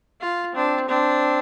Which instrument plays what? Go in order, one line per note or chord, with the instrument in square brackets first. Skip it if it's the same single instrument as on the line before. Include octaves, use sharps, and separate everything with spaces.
[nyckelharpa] F4
[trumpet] C4 [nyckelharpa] D4
[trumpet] C4 [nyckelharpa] D4